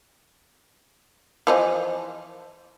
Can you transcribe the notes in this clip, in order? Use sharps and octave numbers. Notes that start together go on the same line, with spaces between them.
E3 F3 D#5